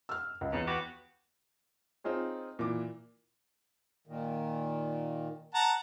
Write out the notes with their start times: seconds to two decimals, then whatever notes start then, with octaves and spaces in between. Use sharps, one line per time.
0.09 E6 F6
0.41 C#2
0.53 E2 C#3
0.67 B3 F#4 G4
2.04 C4 D#4 F4 G#4 C#5
2.59 A#2 E3 D6
4.07 A#2 D#3
5.55 F#5 A5 A#5